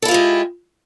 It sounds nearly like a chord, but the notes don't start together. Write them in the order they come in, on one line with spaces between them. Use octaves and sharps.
A4 E4 F4 G4 G#3